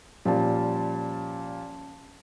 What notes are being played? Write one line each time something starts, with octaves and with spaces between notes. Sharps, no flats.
A#2 F3 G3 C#4 A5